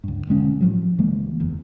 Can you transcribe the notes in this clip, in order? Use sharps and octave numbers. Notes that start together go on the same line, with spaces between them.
C#2 G2
E1 D3 G#3 C#4
A2 F3 F#3
C#2 E3 G#3 A#3
F#1 E2